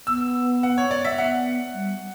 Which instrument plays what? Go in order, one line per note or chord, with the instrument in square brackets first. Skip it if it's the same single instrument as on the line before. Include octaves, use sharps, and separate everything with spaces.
[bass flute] B3 [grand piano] E6
[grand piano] F#5
C#5
D5
E5
[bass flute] B3 [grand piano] F#5
[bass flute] G3